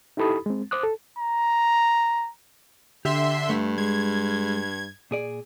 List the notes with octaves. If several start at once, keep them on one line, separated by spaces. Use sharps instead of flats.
D#4 E4 G4 A4 B5 D#6
G#3 C4
C5 D6 D#6 F#6
A4
A#5
D3 G4 E5 C6
G2 A3
G#3 G#6
A#2 G#4 D5